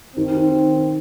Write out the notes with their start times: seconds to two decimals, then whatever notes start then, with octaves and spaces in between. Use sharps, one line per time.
0.16 D#3 C4
0.36 D#3